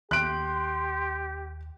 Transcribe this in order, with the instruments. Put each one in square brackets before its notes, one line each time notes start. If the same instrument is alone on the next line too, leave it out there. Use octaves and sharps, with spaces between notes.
[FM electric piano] D#2 [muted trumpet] G4 [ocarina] C6 [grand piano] F#6 D7